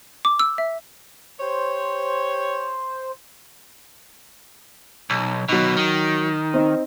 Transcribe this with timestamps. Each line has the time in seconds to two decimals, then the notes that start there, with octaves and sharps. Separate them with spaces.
0.25 D6
0.39 E6
0.58 E5
1.40 G4 C5 C#5
5.10 B1
5.49 D#2 B2 F#3 D#4
5.77 D#3
6.54 C4 D#4